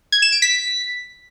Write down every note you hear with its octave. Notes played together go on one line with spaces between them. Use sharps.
G#6
E7
D7
B6